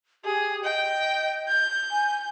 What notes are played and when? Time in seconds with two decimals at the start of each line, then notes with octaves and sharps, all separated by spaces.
0.25 G4 G#4
0.64 D#5 G5
1.48 G6
1.91 G#5